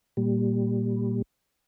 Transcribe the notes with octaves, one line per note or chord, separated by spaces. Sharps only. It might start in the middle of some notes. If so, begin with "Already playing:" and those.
A#2 G3